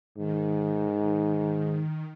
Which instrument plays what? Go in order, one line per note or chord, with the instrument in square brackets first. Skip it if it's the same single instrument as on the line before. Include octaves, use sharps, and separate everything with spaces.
[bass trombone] G#2 [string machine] D#3